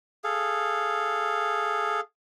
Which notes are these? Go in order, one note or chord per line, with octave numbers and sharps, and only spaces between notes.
G#4 A4 F5